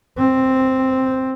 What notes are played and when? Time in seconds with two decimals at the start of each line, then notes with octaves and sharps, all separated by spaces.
0.17 C4